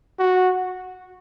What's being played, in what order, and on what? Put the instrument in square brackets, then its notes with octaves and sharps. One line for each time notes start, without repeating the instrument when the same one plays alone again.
[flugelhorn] F#4